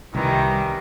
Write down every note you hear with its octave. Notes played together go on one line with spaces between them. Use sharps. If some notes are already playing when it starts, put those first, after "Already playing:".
C2 D#3 E3 G3